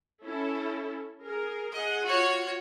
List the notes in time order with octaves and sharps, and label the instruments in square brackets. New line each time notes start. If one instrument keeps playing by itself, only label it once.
[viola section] C#4 E4 A4
G#4 A#4
[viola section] G#4 F#5 [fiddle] D#5
[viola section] F4 [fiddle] F#4 C#5